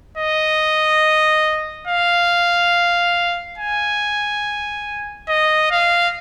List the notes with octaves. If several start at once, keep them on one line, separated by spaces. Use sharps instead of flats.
D#5
F5
G#5
D#5
F5